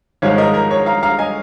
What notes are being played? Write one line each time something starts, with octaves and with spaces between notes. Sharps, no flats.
G#1 G#2 F3 G#3 C#5 F5
A#4 D#5
A#4
C#5
F5 A#5
F5 A#5
D#5 G#5